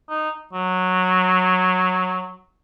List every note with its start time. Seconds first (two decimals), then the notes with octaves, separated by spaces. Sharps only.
0.10 D#4
0.53 F#3